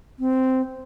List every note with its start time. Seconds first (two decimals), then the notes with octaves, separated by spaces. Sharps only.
0.19 C4